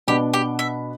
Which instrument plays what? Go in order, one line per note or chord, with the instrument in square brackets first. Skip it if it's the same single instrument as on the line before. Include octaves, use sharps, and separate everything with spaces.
[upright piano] B2 B3 D4 [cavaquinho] G4
[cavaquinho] G4
E5